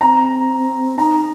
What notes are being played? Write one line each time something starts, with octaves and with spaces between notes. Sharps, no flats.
C4 A#5
D#4 A#5